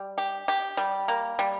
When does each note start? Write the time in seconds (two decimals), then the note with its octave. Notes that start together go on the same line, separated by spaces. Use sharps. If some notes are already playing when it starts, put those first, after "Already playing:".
Already playing: G3
0.18 G4
0.48 G4
0.77 G3
1.08 A#3
1.39 G3